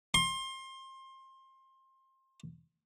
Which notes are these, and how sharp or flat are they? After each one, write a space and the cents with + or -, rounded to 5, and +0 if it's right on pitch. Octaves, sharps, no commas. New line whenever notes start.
C6 +25